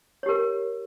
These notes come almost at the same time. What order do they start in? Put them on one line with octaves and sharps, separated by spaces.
C#5 G4 A#4